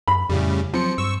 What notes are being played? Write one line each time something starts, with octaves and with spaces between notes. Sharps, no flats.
F#2 B5
F2 A2 C#3 G3
F3 F#3 C4 C#7
G2 C#6 E6